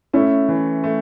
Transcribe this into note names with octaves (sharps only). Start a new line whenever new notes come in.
A3 C#4 E4
E3
A3